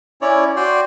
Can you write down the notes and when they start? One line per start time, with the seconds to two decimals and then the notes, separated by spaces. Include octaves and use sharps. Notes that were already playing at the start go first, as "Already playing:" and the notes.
0.22 C#4 E4 C#5 D5
0.56 F#4 D5 G5 C6